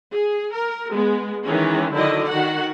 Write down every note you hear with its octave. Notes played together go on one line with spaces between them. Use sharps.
G#4
A#4
G#3 B3
D#3 E3 G#3 C#4
D3 D#3 F#3 E4 D5 D#5
D#3 F#4 F#5